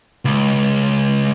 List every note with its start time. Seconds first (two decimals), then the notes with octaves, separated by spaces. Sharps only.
0.25 C#2